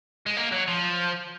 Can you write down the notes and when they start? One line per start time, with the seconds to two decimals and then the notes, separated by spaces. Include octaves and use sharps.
0.26 G#3
0.37 A#3
0.52 F#3
0.68 F3